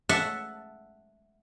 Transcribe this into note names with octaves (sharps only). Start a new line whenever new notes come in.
E5 F#5 A5